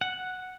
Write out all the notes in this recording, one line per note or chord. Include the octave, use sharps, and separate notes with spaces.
F#5